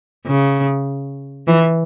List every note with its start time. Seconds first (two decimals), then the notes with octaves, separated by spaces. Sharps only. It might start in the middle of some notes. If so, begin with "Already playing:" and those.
0.27 C#3
1.47 E3